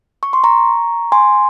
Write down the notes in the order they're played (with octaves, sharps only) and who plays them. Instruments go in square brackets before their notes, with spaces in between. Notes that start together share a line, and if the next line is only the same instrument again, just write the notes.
[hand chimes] C#6
C6
A#5 C#6
G#5 C6